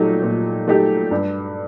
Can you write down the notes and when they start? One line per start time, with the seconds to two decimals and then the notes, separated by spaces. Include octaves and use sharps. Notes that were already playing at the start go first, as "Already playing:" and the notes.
Already playing: A#2 F#3 A3 D#4 G4
0.22 A#2
0.67 F#3 A3 D#4 G4
1.11 G2